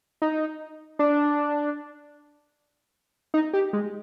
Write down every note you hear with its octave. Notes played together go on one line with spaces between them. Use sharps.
D#4
D4
D#4
G4
G#3